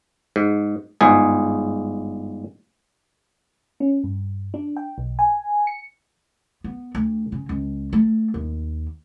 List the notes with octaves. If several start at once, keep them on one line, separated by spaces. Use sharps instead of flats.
G#2
G1 G#2 G#4
C#4
G2
D4
G5
B1
G#5
C#7
B3
D2
C#3
C#2
A3
D#2